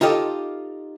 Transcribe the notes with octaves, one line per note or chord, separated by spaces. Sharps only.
D#4 F4 G4 A4 D#5